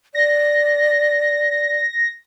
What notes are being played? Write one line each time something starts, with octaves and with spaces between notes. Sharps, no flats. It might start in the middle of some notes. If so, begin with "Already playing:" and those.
D5 A#6